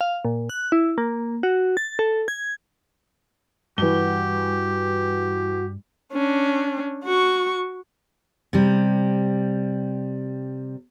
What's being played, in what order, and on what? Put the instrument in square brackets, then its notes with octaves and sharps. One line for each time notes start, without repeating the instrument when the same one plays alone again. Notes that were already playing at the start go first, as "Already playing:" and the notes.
[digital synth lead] F5
A#2
F#6
E4
A#3
F#4
A6
A4
G#6
[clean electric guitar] G2 [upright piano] E3 G7 [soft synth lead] F#4 [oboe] G4
[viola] C#4 D4
F#4 C#6
[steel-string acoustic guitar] C3 G3